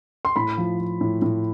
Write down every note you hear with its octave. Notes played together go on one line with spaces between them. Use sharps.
C6
A2 B5
F3
F3
A2
A2